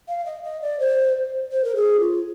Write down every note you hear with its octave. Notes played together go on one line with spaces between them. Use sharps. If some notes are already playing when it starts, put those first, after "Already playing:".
F5
D#5
D#5
D5
C5
C5
A#4
G#4
F4